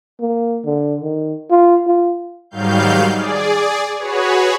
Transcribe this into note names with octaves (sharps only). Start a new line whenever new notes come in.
A#3
D3
D#3
F4
F4
G#2 D#3 F#3 G3 F5 G6
G#4 D5
F#4 G#4 B4 C#5